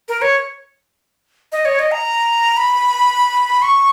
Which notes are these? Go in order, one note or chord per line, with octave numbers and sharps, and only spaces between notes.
A#4
C#5
D#5
C#5
D#5
A#5
B5
C#6